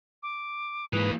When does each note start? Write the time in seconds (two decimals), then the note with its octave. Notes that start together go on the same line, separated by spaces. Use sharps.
0.23 D6
0.93 G#2 E3 A#3 B4 D#6